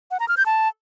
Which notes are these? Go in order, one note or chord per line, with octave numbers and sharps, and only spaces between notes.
F#5
A#5
F6
G6
A5